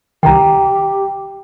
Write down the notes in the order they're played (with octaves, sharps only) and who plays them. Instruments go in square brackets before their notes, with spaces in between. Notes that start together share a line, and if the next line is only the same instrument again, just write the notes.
[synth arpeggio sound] C2 C3 D#3 [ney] G4 [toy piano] F#5 A#5 [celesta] G5